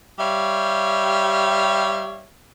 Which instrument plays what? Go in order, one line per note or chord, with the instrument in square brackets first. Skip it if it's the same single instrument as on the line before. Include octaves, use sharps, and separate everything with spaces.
[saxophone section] G3 G4 C#5 E5 F5